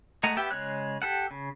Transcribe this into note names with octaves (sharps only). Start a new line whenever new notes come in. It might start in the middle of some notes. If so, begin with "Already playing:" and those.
G#3 A3 D#5 F#5 A#5
B3 G4 E5 G5
C#3 G#3 C#5 F#6
G4 A4 F#5
C#3